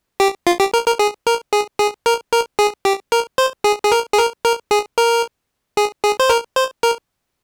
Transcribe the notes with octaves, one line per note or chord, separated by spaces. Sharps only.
G4
F4
G4
A#4
A#4
G#4
A#4
G#4
G#4
A#4
A#4
G#4
G4
A#4
C5
G#4
G#4
A#4
G#4
A#4
A#4
G#4
A#4
G#4
G#4
C5
A#4
C5
A#4